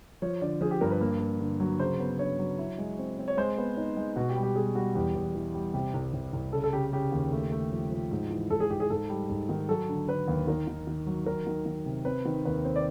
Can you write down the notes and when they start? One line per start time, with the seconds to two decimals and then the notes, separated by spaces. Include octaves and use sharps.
0.22 F3 C#5
0.41 D3 D5
0.61 F3 G#4
0.71 G4
0.81 G2 A#4
0.91 B4
1.01 A#3
1.20 A#3
1.40 D3
1.60 F#3
1.79 C#3 C5
1.99 B3
2.19 D4 C#5
2.39 F#3
2.58 E4
2.78 G#3
2.99 C4
3.18 C4
3.28 C#5
3.37 G#3 C5
3.58 B3
3.77 D#4
3.97 G#3
4.16 B2 F#4
4.29 G4
4.36 G3
4.43 G4
4.56 G3 G#4
4.75 G3 F#4
4.95 E2 G4
5.15 E2
5.35 E3
5.54 G3
5.74 C3 G4
5.94 C2
6.14 C2
6.33 C2
6.53 C#3 A4
6.64 A4
6.73 C#3 G4
6.93 C#3 G4
7.12 D#2
7.32 A3
7.52 A3
7.72 F3
7.91 F3
8.11 G#2
8.31 E3
8.50 G#2 A4
8.60 G#4
8.70 G#2 G4
8.80 G#4
8.90 G#2 A4
9.09 G3
9.29 G#2
9.49 D#3
9.69 F#3 A4
9.89 D3
10.08 D3 B4
10.28 D#2
10.47 D#3 A#4
10.68 D#3
10.87 D#3
11.07 F#3
11.26 D#3 A#4
11.47 D#3
11.66 D#3
11.86 C3
12.05 C4 B4
12.25 D#3
12.45 D#2 B4
12.65 C4
12.76 D5